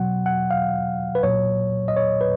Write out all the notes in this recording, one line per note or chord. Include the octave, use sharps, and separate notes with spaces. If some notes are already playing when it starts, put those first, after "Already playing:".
Already playing: B2 F#3 F#5
F#5
F5
B4
A#2 F#3 C#5
D#5
C#5
B4